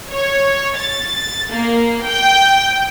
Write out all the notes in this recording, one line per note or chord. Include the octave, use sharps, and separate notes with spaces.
C#5
A6
A#3
G5